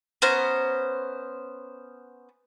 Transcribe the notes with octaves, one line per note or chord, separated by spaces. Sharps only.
B3 C#4 C5 A#5